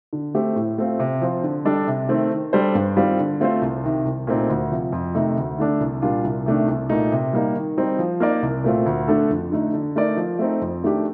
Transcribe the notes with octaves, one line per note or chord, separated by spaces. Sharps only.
D3
A3 C4 G4
A2
A3 C4 F4
C3
F3 C4 F4
D3
G3 D4 A4 D5
C3
D#3 A3 C4
D#3
G3 D4 A4 C5
G2
D#3 G3 C4 F4
D3
A3 C4 F4 C5
C2
C3 D#3
C2
A#2 A3 C4 D#4
D2
C3 F3
F2
C3 D#3 A3 D#4
D2
D3 A3 D4 A4
C2
A#2 G3 D4 F4
C2
C3 D#3 A3 D4
C2
A#2 A3 D#4
C3
G3 A#3 D#4
D#3
G3 C4 D#4
F3
A#3 D#4 A#4 D5
C2
A#2 A3 C4 F4
D2
D3 A3 D4 A4
F2
D3 A3 D#4
D3
A3 D#4 A#4 D5
F3
A3 C4 D#4
F2
D#3 A3 D4 G4